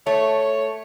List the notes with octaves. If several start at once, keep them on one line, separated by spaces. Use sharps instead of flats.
A3 C#5